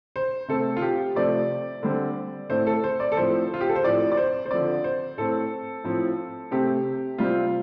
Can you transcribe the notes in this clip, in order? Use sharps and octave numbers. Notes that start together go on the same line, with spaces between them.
C5
C3 A3 C4 A4
F4
G4
C3 F3 A3 C4 D5
D3 G3 C4
A2 A3 C4 C5
A4
C5
D5
A4
A2 F3 A3 C4 C5
F4
G4
A4
C5
A2 F3 C4 D5
D5
C5
C5
D3 F3 C4 D5
C5
A2 A3 C4 A4
A2 F3 C4
C3 A3 C4 G4
C3 G3 C4 F4